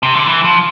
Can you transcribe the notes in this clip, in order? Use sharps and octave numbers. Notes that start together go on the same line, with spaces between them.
C3
D3
E3
F3